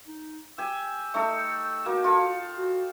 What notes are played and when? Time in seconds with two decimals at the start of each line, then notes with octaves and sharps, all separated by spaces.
0.07 D#4
0.58 G4 G#5 E6
1.14 A3 D#4 A4
1.86 A#3 F#4
2.04 F4 A4
2.57 F#4